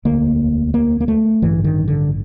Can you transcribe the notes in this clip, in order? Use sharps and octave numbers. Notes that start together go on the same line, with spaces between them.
E1 D2 D3 A#3
A#3
A#3
A3
A1 G2 D3 E3
D#3
D3